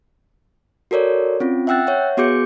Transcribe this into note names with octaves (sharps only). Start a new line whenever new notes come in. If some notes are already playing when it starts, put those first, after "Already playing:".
F#4 A4 A#4 C#5 D5
C4 C#4 F4
E5 F#5 G5 E6 F#6 A6
C#5 E5 F#5
B3 F#4 G#4 D6 G6 C#7